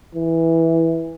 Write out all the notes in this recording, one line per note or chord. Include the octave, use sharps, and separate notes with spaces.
E3